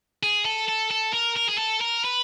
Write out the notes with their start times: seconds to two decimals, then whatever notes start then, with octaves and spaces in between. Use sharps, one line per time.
0.23 G#4
0.45 A4
0.69 A4
0.91 A4
1.14 A#4
1.37 A#4
1.49 G#4
1.58 A4
1.81 A#4
2.04 B4